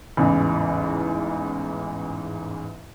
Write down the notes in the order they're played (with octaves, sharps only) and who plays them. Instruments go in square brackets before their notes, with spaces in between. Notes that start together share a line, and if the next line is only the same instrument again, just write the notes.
[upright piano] A1 E2 G#2 C#3 E3